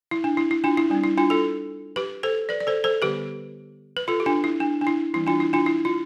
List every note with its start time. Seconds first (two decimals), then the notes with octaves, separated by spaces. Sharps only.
0.11 E4
0.24 D4
0.37 E4
0.51 E4
0.64 D4 F4
0.77 E4
0.90 G3 C4 D4
1.04 E4
1.18 D4 F4
1.30 F4 A4
1.96 G4 B4
2.23 A4 C5
2.49 B4 D5
2.60 D5
2.67 A4 C5
2.84 A4 C5
3.02 D3 G3 B3 G4 B4
3.97 B4
4.08 F4 A4
4.20 G4
4.26 D4 F4
4.44 E4
4.60 D4
4.81 D4
4.87 E4
5.13 E3 G3 C4 E4
5.26 D4 F4
5.40 E4
5.53 D4 F4
5.66 E4
5.85 F4